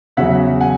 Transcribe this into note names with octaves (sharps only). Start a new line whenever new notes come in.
E2 C#3 F#3 E5 F#5
F#5 G#5